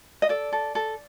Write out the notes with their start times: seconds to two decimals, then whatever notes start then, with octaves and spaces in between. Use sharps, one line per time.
0.22 D#5
0.29 A4 D5
0.52 A4
0.75 A4